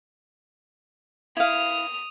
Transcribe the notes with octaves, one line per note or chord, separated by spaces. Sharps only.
E4 F5 D#6 F7